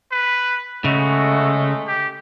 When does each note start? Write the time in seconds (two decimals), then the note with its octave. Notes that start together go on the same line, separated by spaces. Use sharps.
0.12 B4
0.84 C#3 G#3 A3 F#4
1.88 G4